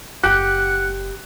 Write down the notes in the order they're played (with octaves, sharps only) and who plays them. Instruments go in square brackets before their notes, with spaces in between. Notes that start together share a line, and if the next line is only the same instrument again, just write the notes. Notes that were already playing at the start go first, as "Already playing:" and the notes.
[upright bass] F#1 [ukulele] G4 [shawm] F#5 [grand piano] F#6